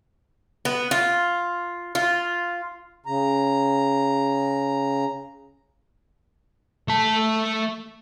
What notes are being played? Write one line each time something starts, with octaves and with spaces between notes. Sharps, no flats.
B3
F4
F4
C#3 A#5
A3 A5